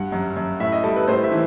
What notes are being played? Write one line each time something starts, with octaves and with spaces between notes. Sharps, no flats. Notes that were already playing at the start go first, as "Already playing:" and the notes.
Already playing: G2 F#5
F#2
F#2
A2 E5
D#5
G3 A4
B4
A2 C5
E5
E3